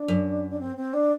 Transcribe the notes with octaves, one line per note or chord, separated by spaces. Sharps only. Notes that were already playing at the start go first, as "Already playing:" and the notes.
Already playing: D4
F#2
D4
C4
C4
D4